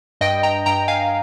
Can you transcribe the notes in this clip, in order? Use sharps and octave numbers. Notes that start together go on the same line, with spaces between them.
G2 D#5 G5
G5 A#5
G2 G5 A#5
F5 G#5